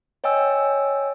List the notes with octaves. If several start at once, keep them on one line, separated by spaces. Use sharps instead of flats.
C#5 D#5 G5 G#5 E6